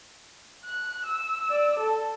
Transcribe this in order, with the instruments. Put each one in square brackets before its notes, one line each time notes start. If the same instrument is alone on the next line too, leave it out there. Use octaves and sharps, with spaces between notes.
[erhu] F#6
E6
[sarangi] D5
A4